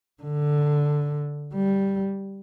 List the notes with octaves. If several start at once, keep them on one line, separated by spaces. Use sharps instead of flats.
D3
G3